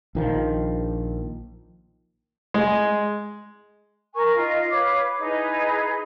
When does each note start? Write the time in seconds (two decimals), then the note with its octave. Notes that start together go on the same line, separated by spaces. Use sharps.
0.15 A#1 D#3 F3
2.54 G#3
4.15 A#4 G#5 A#5 C#6
4.35 D#4 F4 D#5 F5
4.70 B4 C#5 F5 D6
5.20 D#4 E4 G#4 B4